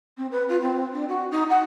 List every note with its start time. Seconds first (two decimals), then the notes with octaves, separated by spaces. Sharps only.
0.17 C4
0.31 B4
0.49 F4
0.61 C4
0.93 D4
1.08 F#4
1.31 D#4
1.50 F#5